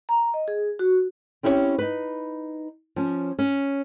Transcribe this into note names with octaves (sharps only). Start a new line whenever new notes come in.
A#5
D#5
G#4
F#4
C4 C#4 E4 G4 A#4 C#5
D#4 B4
F3 C#4
C#4